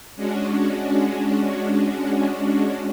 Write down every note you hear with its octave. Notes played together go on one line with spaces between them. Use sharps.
G#3 C#4 D4 F#4